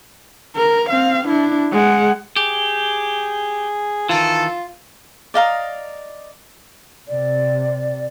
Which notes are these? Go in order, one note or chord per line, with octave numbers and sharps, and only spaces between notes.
A#4
C4 F5
D4 E4
G#3 F#5
G4 G#4
D#3 E3 F4 A4
D5 D#5 F5 A#5
C3 D5